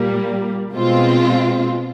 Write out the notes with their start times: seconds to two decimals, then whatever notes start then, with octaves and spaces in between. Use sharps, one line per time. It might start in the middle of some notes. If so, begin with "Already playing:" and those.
Already playing: A#2 G3 A#3
0.74 B2 G#3 C4 F4